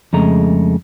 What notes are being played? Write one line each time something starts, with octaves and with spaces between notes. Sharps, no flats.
F2 C#3 G#3 A3 A#5